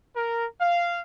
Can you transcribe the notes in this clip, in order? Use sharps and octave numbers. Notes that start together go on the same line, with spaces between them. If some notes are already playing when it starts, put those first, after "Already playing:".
A#4
F5